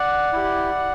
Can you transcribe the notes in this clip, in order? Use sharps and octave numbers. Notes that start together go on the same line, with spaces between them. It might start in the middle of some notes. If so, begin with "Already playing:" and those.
Already playing: D5 F#5
E4 G4